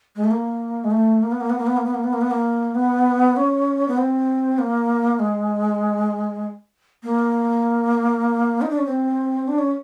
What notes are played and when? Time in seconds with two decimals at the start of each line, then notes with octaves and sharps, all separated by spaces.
0.16 G#3
0.24 A3
0.31 A#3
0.84 G#3
0.91 A3
1.22 A#3
1.32 B3
1.41 A#3
1.50 B3
1.58 A#3
1.67 B3
1.77 A#3
1.85 B3
1.94 A#3
2.04 B3
2.13 A#3
2.21 B3
2.31 A#3
2.75 B3
3.37 C#4
3.88 B3
3.98 C4
4.58 A#3
5.19 G#3
7.03 A#3
8.62 D#4
8.70 D4
8.78 C#4
8.86 C4
9.48 D4
9.59 C#4